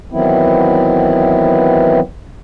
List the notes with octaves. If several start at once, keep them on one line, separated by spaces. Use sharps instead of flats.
D#3 E3 F#3 B3 C4 E4